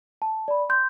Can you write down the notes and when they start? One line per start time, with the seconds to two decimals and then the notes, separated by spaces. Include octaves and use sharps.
0.22 A5
0.48 D5 B5
0.69 C6 G6